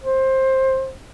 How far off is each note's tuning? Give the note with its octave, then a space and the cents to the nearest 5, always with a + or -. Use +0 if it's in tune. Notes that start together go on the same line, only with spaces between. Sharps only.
C5 +15